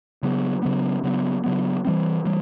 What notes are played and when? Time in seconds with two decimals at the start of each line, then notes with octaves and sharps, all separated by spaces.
0.23 C#3 F#3 B3
0.63 C#3 F#3 B3
1.03 C#3 F#3 B3
1.44 C#3 F#3 B3
1.85 E3 G3 C4
2.25 E3 G3